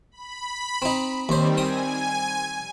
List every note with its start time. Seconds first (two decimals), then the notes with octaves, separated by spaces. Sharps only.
0.11 B5
0.82 C4 D#4
1.29 D#2 D#3 G3 C4 C5
1.57 C4 G#5 D#6